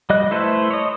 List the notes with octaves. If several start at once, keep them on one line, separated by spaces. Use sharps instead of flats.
G3 D#5 F#6
A3 E4 A4 B4 C5
C#5 D#5